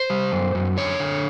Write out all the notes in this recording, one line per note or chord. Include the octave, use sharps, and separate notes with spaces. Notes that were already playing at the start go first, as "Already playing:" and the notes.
Already playing: C5
G3
F#2
F#2
D3 C#5
D3